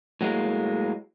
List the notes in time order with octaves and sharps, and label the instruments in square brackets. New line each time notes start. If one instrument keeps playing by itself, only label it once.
[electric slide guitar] A2 F#3 G#3 A#3